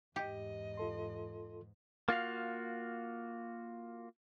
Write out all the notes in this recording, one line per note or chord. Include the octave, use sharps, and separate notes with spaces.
E2 G#2 G4 D#5
F4 A4 C6
A#3 F4 F#4 F5